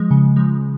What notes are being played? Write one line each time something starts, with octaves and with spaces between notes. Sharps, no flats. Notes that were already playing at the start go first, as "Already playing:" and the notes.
Already playing: F3 G#3
C#3
F3 G#3